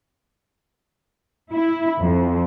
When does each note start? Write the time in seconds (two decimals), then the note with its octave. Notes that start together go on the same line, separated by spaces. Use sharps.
1.53 E4
2.02 F2